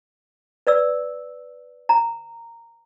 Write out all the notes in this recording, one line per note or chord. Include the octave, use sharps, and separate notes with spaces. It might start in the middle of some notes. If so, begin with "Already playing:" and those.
B4 D5 E6
A#5